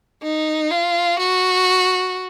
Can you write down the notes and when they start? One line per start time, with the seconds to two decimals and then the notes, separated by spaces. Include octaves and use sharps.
0.23 D#4
0.71 F4
1.19 F#4